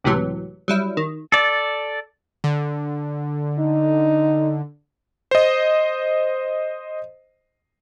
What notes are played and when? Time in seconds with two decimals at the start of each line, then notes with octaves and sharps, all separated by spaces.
0.04 C#2 A2 C3 E3 F#3
0.68 F#3 G3 E4
0.97 D#3
1.32 A4 D5
2.44 D3
3.59 D#4
5.31 C5 D#5